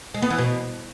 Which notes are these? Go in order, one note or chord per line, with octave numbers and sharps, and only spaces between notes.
G#3
B3
E3
B2